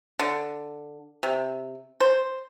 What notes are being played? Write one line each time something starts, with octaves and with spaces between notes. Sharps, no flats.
D3
C3
C5